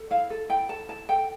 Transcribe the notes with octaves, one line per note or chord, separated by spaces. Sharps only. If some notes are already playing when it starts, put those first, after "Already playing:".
Already playing: A4
E4 F5
A4
E4 G5
A4 A5
E4 A5
A4 G5